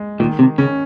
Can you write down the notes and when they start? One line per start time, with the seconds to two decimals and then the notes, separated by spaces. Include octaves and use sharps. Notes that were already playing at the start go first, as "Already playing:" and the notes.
Already playing: G#3
0.20 A#2 D#3
0.39 C3
0.58 C#3 C#4